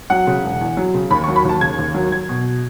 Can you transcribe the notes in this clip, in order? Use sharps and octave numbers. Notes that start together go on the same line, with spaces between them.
F#3 F#5
C#3
E1
E2
F#3
C#3
D#2 B5
C#6
F#3
B5
D#2 A5
C#3 G#6
D#2
F#3
F#3 G#6
B2